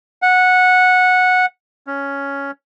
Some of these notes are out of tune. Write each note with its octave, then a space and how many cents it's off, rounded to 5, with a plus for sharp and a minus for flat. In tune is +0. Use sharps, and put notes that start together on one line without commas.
F#5 -10
C#4 +5